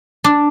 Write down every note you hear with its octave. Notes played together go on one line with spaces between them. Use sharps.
D4